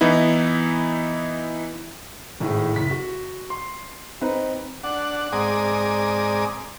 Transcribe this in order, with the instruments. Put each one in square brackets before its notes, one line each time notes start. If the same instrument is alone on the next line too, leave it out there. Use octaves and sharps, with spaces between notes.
[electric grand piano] E3 B3 D#4 E4
[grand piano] G#1 A2 G#4
F#1 B6
F#4
C6
C4 D#4 B4
[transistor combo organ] D4 F#5
G#2 C4 D5 G#5 A#5 D#6